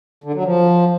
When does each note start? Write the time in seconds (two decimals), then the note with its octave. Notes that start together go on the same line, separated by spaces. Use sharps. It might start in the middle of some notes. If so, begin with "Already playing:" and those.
0.24 D3
0.34 F#3
0.45 F3